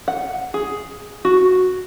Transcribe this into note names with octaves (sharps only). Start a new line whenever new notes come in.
F#5
G#4
F#4